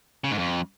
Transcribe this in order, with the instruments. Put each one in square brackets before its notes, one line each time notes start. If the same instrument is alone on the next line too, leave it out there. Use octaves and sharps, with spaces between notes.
[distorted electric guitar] C#3
G#2
F2